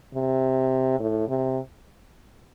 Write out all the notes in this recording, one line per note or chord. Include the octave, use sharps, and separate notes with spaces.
C3
A2
C3